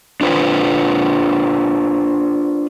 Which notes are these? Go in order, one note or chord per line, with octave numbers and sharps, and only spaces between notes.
D4 F4 B4 C5